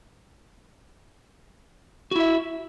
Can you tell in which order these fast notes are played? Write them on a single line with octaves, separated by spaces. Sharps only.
F#4 E4 E5